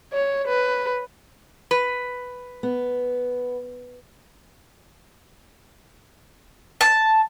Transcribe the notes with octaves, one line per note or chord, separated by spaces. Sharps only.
C#5
B4
B4
B3
A5